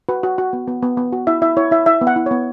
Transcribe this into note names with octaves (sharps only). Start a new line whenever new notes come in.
F#4 B4
F#4
F#4
B3
B3
B3
B3
F#4
E4 E5
E4 E5
E4 C#5
E4 E5
E4 E5
B3
F#5
E4
B3 C#5